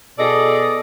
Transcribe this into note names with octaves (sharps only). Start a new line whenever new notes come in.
B2 G#4 A4 D5 D#5